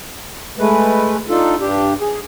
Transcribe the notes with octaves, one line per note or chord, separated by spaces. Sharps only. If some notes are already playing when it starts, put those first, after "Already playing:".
G#3 A3 B4
D4 D#4 F4 A4
G2 D4 G4
G#4